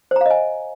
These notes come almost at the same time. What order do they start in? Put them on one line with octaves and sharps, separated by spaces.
C5 A#5 F5 D#5 G#5